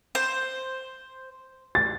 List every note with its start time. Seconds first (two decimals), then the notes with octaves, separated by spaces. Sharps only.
0.15 C5
1.75 A6